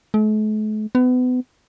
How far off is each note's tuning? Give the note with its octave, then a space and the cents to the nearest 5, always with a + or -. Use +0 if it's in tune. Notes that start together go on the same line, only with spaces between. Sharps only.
A3 -45
B3 +30